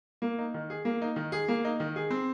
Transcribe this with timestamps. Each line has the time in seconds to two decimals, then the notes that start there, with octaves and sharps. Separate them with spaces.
0.22 A#3
0.38 D#4
0.54 D#3
0.70 G#4
0.85 A#3
1.02 D#4
1.16 D#3
1.32 G#4
1.48 A#3
1.64 D#4
1.80 D#3
1.96 G#4
2.10 C4